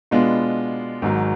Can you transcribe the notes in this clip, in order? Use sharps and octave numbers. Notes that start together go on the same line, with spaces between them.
B2 G#3 B3 D4 F4
G#1 G#2 F#3